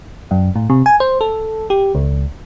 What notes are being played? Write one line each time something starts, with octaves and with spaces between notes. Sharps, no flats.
F#2
A2
C3
G#5
C5
A4
G4
C#2